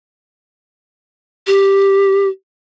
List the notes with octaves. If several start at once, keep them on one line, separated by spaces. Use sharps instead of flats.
G4